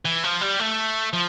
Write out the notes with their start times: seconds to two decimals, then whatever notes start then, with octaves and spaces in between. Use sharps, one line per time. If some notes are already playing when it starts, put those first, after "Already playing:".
0.05 E3
0.23 F3
0.41 G3
0.60 A3
1.13 F3